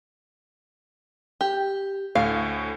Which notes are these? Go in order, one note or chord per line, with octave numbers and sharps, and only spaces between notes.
G4
D2 A2 F5